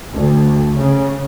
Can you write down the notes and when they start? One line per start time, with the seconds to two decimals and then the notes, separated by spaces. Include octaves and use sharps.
0.14 D2
0.76 C#3